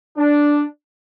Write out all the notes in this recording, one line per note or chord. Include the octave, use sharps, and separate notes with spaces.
D4